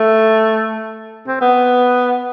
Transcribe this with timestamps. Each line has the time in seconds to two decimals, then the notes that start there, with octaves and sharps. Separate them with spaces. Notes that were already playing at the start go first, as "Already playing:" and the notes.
Already playing: A3
1.27 C4
1.41 B3